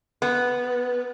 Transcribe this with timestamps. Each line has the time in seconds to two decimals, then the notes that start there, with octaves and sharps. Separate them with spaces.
0.22 B3